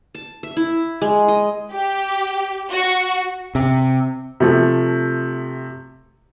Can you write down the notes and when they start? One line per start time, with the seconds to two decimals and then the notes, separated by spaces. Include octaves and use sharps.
0.15 A5
0.43 E5
0.57 E4
1.02 G#3
1.28 D#5
1.72 G4
2.71 F#4
3.55 C3
4.40 C3 F3 A3